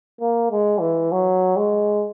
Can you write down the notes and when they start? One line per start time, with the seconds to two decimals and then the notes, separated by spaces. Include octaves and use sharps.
0.21 A#3
0.51 G#3
0.81 E3
1.12 F#3
1.57 G#3